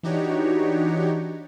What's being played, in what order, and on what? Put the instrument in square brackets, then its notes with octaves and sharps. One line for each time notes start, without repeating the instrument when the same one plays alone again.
[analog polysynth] E3 D4 D#4 F#4 G4 C#5